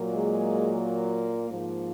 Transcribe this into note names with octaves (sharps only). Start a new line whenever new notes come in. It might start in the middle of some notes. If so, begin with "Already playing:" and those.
Already playing: A#2 F#3 A#3
G#3 G#4
G#2 F3 A#3